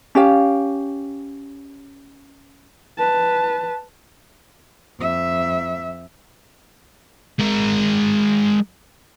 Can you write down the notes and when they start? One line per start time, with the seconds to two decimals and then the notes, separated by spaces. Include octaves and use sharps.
0.15 C#4 G4 F5
2.98 B4 A5
5.00 F2 E5
7.39 G#3 A#4